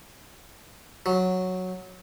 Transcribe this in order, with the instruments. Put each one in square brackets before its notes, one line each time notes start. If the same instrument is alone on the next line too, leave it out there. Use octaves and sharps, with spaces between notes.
[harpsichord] F#3